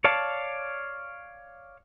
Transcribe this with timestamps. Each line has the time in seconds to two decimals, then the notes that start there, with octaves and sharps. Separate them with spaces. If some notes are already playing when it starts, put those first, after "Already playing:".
0.04 C#5 D5 F5 A5